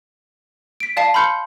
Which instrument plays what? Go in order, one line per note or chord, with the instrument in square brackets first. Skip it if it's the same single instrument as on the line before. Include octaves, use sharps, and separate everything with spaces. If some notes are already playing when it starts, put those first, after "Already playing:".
[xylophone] B6 D7
D5 F5 A5 B6 C7
B5 C6 F6 G6 C#7